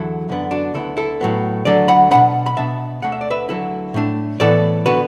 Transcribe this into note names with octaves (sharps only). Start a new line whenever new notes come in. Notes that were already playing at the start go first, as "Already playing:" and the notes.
Already playing: E2 D3 F#3 E4 A4
F#2 D3 B3 D4
D4 F#4
D2 D3 B3 E4 A4
E4 A4
A2 F#3 B3
D2 D3 F#3 A4 D5
F#5 B5
B2 B3 D4 F#5 B5
B5
B2 B3 D4 E5 A5
D2 D3 A3 D4 F#5
E5
D5
B4 E5
D2 D3 F#3 E4 A4
A2 A3 D4
A2 E3 B3 A4 D5
D3 B3 F#4 B4